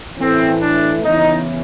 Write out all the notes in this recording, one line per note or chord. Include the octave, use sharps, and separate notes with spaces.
A2 E3 A3 C4
D4
E2 C#3 E3 D#4